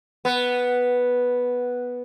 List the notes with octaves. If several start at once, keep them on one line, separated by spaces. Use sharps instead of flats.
B3